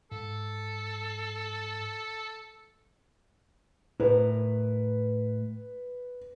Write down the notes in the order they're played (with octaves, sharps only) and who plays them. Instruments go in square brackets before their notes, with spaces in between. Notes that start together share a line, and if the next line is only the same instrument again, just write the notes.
[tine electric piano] G#2 [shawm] A4
[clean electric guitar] A2 A#4 [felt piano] B4